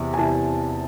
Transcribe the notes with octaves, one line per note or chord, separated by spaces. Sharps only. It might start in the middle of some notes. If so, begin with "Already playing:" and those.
Already playing: E2 C3
G#5
E2 C3 E3 A5